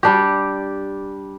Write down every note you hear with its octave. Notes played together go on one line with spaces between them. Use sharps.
G3 D4 G4